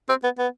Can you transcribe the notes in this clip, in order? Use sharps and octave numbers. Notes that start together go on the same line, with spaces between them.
C4
B3
B3